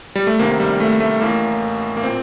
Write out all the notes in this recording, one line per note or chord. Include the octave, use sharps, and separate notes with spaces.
G3
A3
D2 C3 D#3 A#3
G3
A3
A3
A1 A2 A#3
A#3
A#2 C4